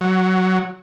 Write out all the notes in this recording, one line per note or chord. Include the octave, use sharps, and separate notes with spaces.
F#3